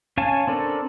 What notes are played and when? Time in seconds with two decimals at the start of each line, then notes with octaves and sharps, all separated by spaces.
0.17 C#4 C#5 F5 G#5 A5
0.47 C4 D4 A4 A#4